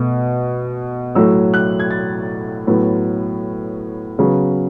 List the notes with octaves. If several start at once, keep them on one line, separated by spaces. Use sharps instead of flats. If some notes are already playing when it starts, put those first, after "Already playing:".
Already playing: B2 A3
A2 F#3 A3 E6
F#6
G#6
A6
A2 F#3 B3
C#3 F#3 B3